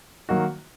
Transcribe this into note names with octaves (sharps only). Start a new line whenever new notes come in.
D#3 F#3 A#3 D#4 F#4